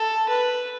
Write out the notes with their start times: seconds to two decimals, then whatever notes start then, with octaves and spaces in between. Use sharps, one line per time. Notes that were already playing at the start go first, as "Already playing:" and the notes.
Already playing: A4
0.29 B4